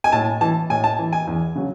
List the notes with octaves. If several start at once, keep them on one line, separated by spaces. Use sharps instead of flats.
G#5
A2 A5
E3 A5
A2 G#5
A5
E3
G#5
E2
C#3 F#3